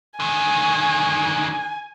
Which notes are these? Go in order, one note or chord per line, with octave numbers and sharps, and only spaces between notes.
D3 D#3 G#5